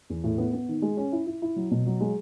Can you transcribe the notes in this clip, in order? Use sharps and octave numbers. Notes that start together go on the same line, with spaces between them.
E2
A2
B3
B3
D#3
G#3
C#4
E4
E4
E4
F#3
B2
F#3
G#3